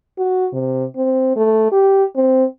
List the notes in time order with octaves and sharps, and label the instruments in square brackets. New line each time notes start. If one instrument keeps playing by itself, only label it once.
[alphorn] F#4
C3
C4
A3
G4
C4